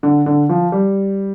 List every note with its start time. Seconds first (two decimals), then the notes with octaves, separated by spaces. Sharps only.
0.03 D3
0.26 D3
0.49 F3
0.72 G3